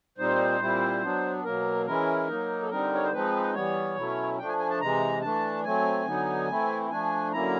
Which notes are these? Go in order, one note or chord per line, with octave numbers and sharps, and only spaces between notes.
A#2 G3 C4 D#4 C5
A#2 G3 C4 E4
F#3 B3 D4
B2 F#3 A#3 A#4
E3 G#3 C#4 E4 A#4
F#3 A#3 D#4
A4
D3 G3 C4 D#4 A#4
C#5
C5
F3 G#3 C4 D#4 B4
E3 G3 B3 C#5
B2 F#3 A3 C#4 E4
F3 A3 D4 G5
G#5
G#5
A5
C3 E3 G#3 A#5
E3 A3 D4 A5
F#3 A3 C4 G#5
D3 F#3 B3 D#4
E3 A3 C4 E4
F3 A3 D4 G#5
D3 F#3 A#3 C#4 E4 A#5